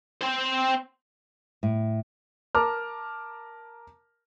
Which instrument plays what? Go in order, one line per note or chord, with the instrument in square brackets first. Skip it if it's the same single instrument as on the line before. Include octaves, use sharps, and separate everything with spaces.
[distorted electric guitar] C4 C5
[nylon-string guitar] A2
[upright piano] A#4 A5 A#5 D6 F6